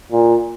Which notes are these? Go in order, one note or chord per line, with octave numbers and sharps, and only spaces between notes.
A#2